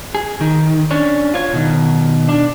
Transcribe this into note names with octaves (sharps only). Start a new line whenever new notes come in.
G#4
D#3
C#4 D4
F4 C#5
B2 D#3
D4